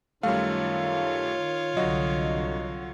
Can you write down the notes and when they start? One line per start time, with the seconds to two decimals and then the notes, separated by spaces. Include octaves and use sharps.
0.23 F#2 D#3 G3 A3 F4 C#5 F5
1.77 C2 D3 F#3 F#4 D#5